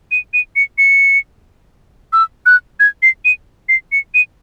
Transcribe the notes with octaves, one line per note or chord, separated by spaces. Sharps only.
D#7
D#7
C#7
C#7
E6
F#6
G#6
C7
D#7
C7
C#7
D#7